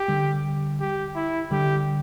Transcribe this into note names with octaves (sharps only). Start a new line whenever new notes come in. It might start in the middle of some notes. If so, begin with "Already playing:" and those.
Already playing: G4
D3 G3
G4
E4
D3 G3 G4